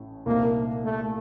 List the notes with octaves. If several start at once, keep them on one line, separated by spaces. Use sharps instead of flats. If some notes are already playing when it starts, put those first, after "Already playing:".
Already playing: A1 A2
C2 A#2 A3 A#3 C4 D#4
A3